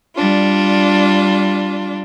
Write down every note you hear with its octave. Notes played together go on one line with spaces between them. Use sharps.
G3 D4 F4